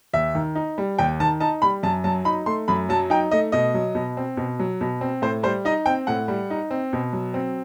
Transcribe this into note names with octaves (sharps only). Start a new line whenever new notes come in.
D#2 E5
D#3
D#4
G3
D#2 G5
D#3 A5
D#4 A5
G3 B5
F#2 A5
F#3 A5
D#4 B5
A3 C6
F#2 B5
F#3 A5
D#4 G5
A3 D#5
B2 D#5
F#3
B2
C4
B2
F#3
B2
C4
A2 C5
G3 C5
D#4 D#5
C4 G5
A2 F#5
G3
D#4
C4
B2
F#3
C4